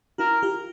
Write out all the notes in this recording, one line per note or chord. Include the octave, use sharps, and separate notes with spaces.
E4 F#4 A#4
F4 G4